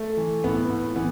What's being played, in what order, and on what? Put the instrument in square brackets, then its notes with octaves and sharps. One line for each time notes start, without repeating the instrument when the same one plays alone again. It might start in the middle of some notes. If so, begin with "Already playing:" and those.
Already playing: [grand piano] A3
E3
A2 B3
A2
E3 B3